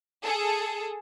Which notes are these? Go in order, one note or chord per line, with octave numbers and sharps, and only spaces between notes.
G#4 A4